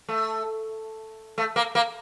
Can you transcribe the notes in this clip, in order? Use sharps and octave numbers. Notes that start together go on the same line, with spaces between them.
A3
A3
A#3
A#3